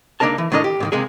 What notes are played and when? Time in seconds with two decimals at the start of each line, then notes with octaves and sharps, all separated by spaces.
0.20 C#2 A#3 D4 D#4 A#4 A5
0.38 E3
0.52 A2 D#3 D4 A#4 D#5
0.64 G4
0.80 G#2 D3 D#3
0.92 C3 G#3 A#3 G#4